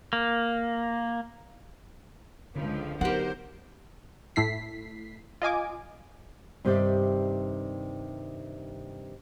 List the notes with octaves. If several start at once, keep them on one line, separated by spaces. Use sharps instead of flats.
A#3
C#2 D3 F3
F#3 B3 D#4 G4 A#4 C5 F#5
A2 A3 E4 B6 C7
F4 D#5 G#5 D6
G2 C3 D#3 G4 D5 E5